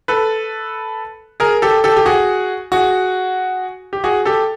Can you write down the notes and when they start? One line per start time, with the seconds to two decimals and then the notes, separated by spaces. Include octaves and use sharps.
0.08 A4 B4
1.40 G#4 A#4
1.62 G4 A4
1.84 G4 A4
1.96 G4
2.06 F#4 G#4
2.72 F#4 G#4
3.93 G4
4.04 F#4 G#4
4.25 G4 A4